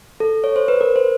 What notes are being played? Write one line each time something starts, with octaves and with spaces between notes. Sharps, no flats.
A4
C#5
C5
B4
A#4
C5